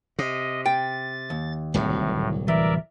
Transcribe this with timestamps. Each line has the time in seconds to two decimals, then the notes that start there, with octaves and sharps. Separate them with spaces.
0.19 C3 D#5
0.66 G5 A6
1.30 D#2
1.74 D1 C2 A2 F#3
2.48 E3 A#4 D5 E5